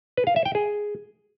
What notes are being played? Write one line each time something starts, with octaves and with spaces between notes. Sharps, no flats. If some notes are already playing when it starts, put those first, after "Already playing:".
B4
F5
E5
G5
G#4